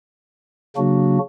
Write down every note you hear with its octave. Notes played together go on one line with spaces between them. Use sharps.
C#3 F#3 A#3 D4 F#4